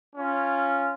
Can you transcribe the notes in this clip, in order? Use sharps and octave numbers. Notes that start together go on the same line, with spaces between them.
C#4 F4